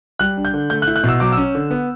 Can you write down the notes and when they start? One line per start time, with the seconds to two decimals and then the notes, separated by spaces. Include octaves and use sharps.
0.19 G3 F#6
0.37 D4
0.45 G6
0.53 D3
0.70 A3 G6
0.82 F#6
0.87 E4
0.96 F#6
1.04 B2
1.09 E6
1.20 F#3 D6
1.32 C#4 E6
1.55 D3
1.71 B3